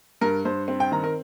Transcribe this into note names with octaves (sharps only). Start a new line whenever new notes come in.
G2 A#4
G2 C5
C4
G5
D#3 A#5
A#4